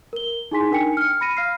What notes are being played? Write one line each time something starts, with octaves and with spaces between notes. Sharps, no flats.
A#4 G7
D#4 E4 G#4 G#5 C6 B6
D4 D#4 A#4 G5 G#5 C#7
F6 C#7
B5 A#6 D#7
F5 F6 C7